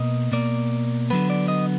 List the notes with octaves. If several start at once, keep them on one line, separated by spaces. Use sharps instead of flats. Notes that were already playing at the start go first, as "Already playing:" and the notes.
Already playing: B2 A#3 D#5
B2 A#3 D5
D3 F#3 B3 B4
D5
D#5